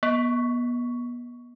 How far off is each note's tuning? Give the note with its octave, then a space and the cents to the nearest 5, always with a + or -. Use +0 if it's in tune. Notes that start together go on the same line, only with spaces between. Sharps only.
B3 -30